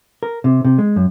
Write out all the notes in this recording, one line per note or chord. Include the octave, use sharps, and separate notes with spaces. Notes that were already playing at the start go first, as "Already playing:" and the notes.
A#4
C3
C3
G#3
F#2